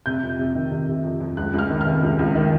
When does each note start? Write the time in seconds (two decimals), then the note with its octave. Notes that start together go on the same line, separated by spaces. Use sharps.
0.06 C3 G6
0.22 F2
0.39 C3
0.55 D#3
0.71 C3
0.88 C3
1.04 F2
1.21 F2
1.37 C#2 F#6
1.54 C#2
1.59 F6
1.70 D#3
1.81 F6
1.86 C3
2.03 C#2
2.19 C#2
2.35 D#3